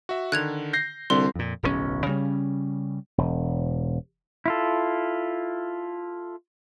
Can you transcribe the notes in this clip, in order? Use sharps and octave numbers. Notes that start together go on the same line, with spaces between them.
F#4 E5
D3 D#3 F#6 G#6 F7
G6 A#6 C7
C2 D3 C6 G7
F2 A#2
D1 B1 A2 C#4
C#3 G3 C4 C#4
E1
E4 F4 A4